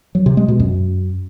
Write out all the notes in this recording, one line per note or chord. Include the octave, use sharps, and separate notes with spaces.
F#3
C3
G#3
B2
F#2